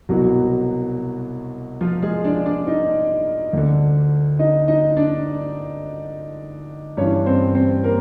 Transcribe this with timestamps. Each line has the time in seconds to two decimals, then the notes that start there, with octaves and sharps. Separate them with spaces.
0.09 C2 B2 F#3 F#4
1.81 F3 F4
2.02 G#3 G#4
2.24 D4 D5
2.46 D4 D5
2.67 D#4 D#5
3.53 D2 D3
4.39 D#4 D#5
4.68 D#4 D#5
4.97 D4 D5
6.97 G2 C#4 C#5
7.01 E3
7.26 C4 C5
7.55 C4 C5
7.84 A#3 A#4